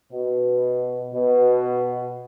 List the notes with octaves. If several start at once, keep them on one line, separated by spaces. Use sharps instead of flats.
B2
B2